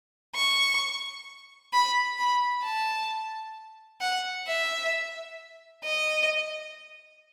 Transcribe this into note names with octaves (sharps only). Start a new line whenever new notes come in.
C#6
B5
B5
A5
F#5
E5
D#5